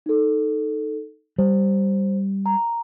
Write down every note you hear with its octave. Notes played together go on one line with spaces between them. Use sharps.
D#4 A4
G3 C5
A#5